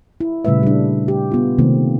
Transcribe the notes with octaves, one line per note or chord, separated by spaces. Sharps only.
E4
A#2 C#3 G3 A3 B4 E5
G3 D4
G4
B3 F4
C3 D#3 A3 A#3 C4